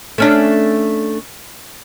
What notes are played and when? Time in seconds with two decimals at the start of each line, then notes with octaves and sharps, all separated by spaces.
0.18 A3 C#4 D4